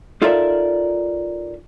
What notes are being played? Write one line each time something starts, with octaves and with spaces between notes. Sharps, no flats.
D#4 F4 A4 A#4 D5 E5